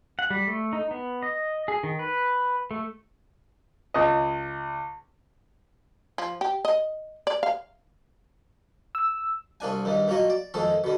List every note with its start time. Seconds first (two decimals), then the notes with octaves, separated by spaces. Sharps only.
0.19 F#5
0.30 G3
0.47 A3
0.73 D#4
0.91 B3
1.23 D#5
1.68 G#4
1.83 D#3
1.99 B4
2.71 A3
3.94 C#2 D#5
6.18 F3
6.41 G4
6.65 D#5
7.27 D5
7.43 F5
8.95 E6
9.60 C2 A#3 D4 G#5
9.85 E2 G2 D#3
10.08 A#2 F#3 A#3 C#5 D#5
10.30 D5
10.54 F2 D#3 G#3 A4
10.84 B2 D3